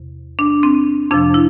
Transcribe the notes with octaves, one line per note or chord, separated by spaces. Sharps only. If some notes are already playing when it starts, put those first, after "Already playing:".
Already playing: E2 C3
D4
C4
F2 C3 F3 D4
E4